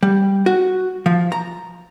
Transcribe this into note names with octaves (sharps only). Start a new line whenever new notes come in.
G3
F#4
F3
A#5